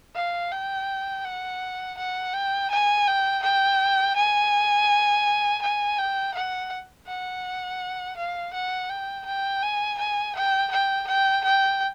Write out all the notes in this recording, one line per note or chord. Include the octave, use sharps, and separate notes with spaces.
F5
G5
F#5
F#5
G5
G#5
G5
G5
G#5
G#5
G5
F#5
F#5
F5
F#5
G5
G5
G#5
G#5
G5
G5
G5
G5